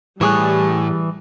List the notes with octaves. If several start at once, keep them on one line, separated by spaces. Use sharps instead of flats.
A2 E3 G3 G#4 C#5 D#6 F#6